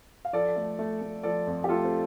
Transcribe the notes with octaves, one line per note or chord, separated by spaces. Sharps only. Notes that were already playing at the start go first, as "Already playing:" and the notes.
F5
F3 A4 D5
A3
A3
A3
F3 A4 D5
F2
G4
A3 F4 A4
C4